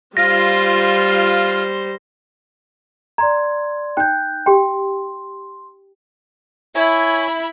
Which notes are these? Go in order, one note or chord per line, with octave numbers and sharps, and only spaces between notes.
G3 F4 C5 A#6
D5 A#5 C6 G#6
D#4 G5 F#6 G6
G4 G5 C6
E4 C#5 E5 G#5 B5